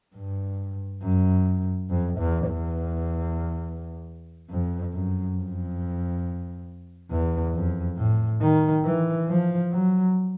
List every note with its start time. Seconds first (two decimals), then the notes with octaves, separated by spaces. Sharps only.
0.15 G2
1.02 F#2
1.89 F2
2.18 E2
2.47 E2
4.50 F2
4.93 F#2
5.36 F2
7.10 E2
7.54 F2
7.97 A2
8.41 D#3
8.84 E3
9.28 F3
9.71 F#3